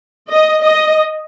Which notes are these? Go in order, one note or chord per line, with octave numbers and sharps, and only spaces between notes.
D#5
D#5